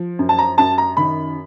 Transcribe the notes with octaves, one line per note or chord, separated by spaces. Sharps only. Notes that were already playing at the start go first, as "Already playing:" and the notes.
Already playing: F3
F#2
A5
A#5
F#2 A5
A#5
D#3 B5